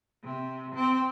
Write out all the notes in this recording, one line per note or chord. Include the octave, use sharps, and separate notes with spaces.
C3
C4